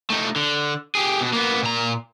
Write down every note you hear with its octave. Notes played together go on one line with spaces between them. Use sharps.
A3 D#4
D3
G4 G#4
B2
A#3 B3
A#2 A#5